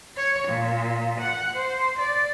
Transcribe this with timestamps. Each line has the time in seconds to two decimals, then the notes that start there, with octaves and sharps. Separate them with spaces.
0.16 C#5
0.47 A#2
1.19 F#5
1.53 C5
1.98 D5